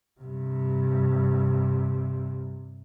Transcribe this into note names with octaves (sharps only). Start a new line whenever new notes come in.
G2 C3